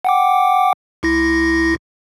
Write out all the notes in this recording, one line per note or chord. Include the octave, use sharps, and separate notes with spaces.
F#5 G5 D6
C#2 E4 A#6